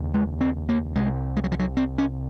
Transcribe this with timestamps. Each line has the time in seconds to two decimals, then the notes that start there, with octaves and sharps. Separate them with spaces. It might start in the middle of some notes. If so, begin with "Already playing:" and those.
Already playing: F1 D#2 C#3
0.14 G#3
0.41 C4
0.69 A#3
0.95 C2 C3 G#3
1.37 G#3
1.44 F#3
1.52 F3
1.59 F#3
1.77 C4
1.98 C#4